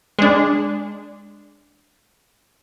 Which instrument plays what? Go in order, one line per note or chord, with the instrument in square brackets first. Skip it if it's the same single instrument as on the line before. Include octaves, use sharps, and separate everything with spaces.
[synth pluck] G#3 D4